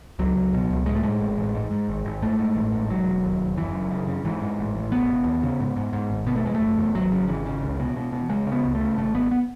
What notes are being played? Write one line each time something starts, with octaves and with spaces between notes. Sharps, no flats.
C#2 F#3
C#2
B2
C#2
A2 G#3
A3
A2 G#3
A1
A1
G#2
G#2
G#1
G#1
G#2 A3
G#2
A1
G#2
E1 F#3
E1
D#2
E1
F#1 E3
F#2
C#3
C#3
G#2 E3
G#2
A1
A1
E1 B3
E1
D#2
C#3
G#2
G#2
G#2
G#1
B2 B3
A3
E2 G#3
A3
F#1
E2
G#1 F#3
C#3
G#1 E3
C#3
C#2
B2
B2
B2
C#3 G#3
C#3
B3
C#2
A3
C#3
G#1 A3
G#1 B3
B3